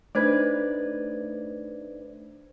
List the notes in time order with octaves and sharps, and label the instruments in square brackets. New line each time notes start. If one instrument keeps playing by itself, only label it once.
[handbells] A3 [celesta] D4 C5 G#6 [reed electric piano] D#4 B4 D5